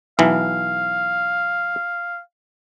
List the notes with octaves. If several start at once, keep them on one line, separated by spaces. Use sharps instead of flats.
B1 E3 F5